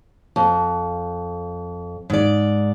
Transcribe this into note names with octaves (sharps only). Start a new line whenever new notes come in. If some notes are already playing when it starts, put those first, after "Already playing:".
F2
G#2 D5